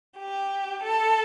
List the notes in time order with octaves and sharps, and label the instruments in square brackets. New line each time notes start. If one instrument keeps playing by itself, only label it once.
[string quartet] G4
A4